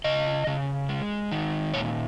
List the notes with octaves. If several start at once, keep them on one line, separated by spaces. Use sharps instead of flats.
C#3 D#5
C#3
G#3
D#3
A#2 C#5